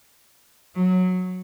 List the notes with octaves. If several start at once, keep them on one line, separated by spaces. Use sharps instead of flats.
F#3